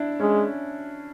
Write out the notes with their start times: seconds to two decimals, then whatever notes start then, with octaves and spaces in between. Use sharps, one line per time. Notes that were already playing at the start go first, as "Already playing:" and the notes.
Already playing: D4 E4
0.20 G#3 C#4